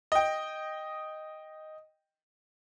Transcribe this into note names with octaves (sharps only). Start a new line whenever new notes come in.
D#5 G5